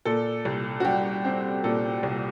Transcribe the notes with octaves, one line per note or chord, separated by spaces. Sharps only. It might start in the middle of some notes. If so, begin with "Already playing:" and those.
A#2 A4
C2
F#4
G3 G4
C4
A#2 A4
C2